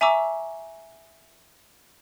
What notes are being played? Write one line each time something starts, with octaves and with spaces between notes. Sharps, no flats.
E5 G#5 A#5 C#6 D6 E6